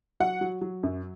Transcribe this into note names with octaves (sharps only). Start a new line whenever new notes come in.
F#3 F#5
F#3
F#3
F#2